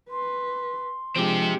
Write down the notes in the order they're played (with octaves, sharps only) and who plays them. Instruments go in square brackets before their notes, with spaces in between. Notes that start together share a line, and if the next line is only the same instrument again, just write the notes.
[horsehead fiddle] B4 [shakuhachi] C6
[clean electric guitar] F3 [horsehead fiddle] G#3 D4 [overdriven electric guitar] C4 G4